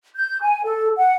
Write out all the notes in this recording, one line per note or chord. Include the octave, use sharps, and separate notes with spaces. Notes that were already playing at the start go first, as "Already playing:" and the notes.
G6
G#5
A4
F#5